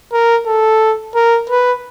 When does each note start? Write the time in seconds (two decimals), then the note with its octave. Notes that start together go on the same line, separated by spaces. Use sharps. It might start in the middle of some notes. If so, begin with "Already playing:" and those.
0.13 A#4
0.47 A4
1.15 A#4
1.50 B4